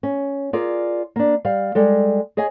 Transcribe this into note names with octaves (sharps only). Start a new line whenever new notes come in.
C#4
F4 G#4 A#4 D5
A#3 D4
G3 F5
G3 G#3 A4
G#4 C#5 D#5 G#5